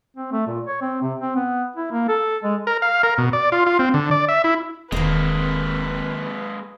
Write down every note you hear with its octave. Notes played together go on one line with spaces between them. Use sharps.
C4
A3
A#2
C#5
C4
C3
C4
B3
E4
A#3
A4
G#3
A#4
F5
A#4
B2
D5
F4
F4
C4
D3
D5
E5
E4
E1 D#3 G#3 A#3 C4 B4